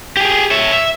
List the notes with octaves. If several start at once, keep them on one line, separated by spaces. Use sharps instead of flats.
G4 G#4
C#5 E5
E5